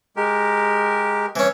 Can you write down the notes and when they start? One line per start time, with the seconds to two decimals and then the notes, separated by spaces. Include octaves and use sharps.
0.16 G#3 G4 A#4
1.36 E3 C#4